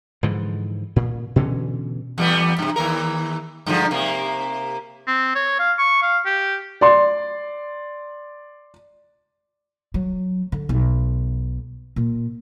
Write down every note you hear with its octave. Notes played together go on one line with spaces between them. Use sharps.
G#2 D3 E3 F3
A#2
B2 D3 E3 C#4
E2 G3 B3
G2 C3
D#2 E3 A#4
G2 D3 F3
C3 A#3
C4
C#5
F5
C#6
F5
G4
D5 C6
F#3
D3
B1
A#2